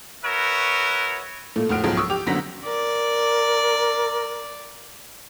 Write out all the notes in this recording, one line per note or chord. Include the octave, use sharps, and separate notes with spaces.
F#4 A#4 B4 C#5 E5
A#2 A3
F1 A2 F#4 F6 D7
C#2 G#2 B2 F3 F#3 G#3
C#6 D#6 E6
G4 D6 F7
F#1 F#2 D3 B3 A#6 B6
A#4 D5